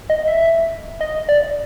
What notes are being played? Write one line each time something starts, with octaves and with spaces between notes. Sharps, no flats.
D#5
E5
D#5
D5